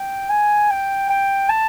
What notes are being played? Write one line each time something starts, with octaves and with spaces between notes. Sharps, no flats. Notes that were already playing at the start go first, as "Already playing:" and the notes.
Already playing: G5
G#5
G5
G5
A5